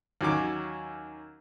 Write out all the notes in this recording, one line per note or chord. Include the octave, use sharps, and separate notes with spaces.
D#2 F#3 C#4 D6